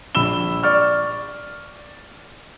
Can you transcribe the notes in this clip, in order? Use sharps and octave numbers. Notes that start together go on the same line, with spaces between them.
A#1 B5 E6 E7 G7
D5 C#6 F6 A6